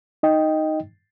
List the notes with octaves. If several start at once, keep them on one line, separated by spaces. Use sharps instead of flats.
D#4 D#5 G5